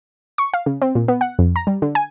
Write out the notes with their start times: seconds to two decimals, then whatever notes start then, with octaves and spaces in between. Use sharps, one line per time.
0.38 C#6
0.54 F5
0.66 C#3
0.82 C4
0.95 A#2
1.08 B3
1.21 F#5
1.39 F2
1.56 A#5
1.67 G3
1.82 D3
1.95 G#5